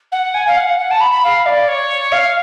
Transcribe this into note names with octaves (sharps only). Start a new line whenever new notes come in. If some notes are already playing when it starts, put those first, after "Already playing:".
F#5
G#5
F5
F#5
F#5
A5
B5
B5
F5
D5
C#5
F5